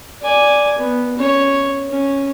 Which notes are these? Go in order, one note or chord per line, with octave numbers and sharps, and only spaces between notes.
D5 G#5
B3
C#4 C#5
C#4